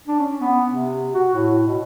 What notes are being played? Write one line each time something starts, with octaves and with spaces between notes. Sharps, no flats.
D4
C#4
B3
C3
F#4
A2
B2